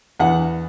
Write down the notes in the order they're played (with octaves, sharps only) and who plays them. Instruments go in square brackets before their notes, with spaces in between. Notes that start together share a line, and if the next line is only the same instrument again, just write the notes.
[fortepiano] E2 F#5